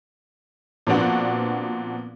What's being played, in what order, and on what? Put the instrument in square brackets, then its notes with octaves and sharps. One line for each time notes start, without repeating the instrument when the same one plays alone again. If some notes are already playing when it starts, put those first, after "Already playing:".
[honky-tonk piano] A#2 F3 B3 C4 D4 F#4